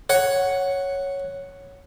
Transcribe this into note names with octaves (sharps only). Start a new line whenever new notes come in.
C#5 F#5